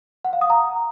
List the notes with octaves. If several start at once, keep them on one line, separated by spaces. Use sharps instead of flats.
F#5
F5
D#6
A#5